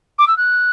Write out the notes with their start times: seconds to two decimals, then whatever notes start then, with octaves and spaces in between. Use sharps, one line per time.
0.18 D6
0.27 E6
0.37 F#6